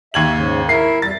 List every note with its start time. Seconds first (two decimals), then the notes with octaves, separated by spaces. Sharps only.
0.14 D#2 E5 G#6 F#7
0.33 G#2 C#3
0.69 E4 A#4 E5 C7
1.02 F2 G3 A6